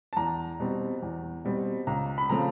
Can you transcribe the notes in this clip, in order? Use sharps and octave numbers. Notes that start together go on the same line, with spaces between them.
A5
E2 A#5
B2 G3 C4
E2
B2 G3 C4
C#2 A#5
B5
C#3 F3 A3 C4 A#5